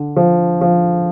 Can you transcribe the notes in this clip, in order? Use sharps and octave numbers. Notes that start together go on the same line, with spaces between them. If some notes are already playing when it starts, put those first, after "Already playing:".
Already playing: D3
F3
F3